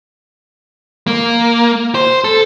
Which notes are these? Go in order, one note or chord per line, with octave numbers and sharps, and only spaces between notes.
A#3
C5
A4